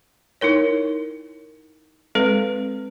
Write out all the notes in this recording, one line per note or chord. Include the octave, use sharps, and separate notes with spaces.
D#4 E4 A#4 C#5
G#3 C4 A4 B4